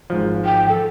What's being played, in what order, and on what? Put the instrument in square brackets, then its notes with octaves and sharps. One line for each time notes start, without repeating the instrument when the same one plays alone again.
[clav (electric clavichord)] G#1 G#2 F3
[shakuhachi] G5
A4